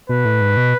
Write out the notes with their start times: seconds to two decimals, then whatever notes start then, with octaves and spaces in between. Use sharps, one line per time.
0.09 B2 B4
0.25 A2
0.41 G#2
0.57 B2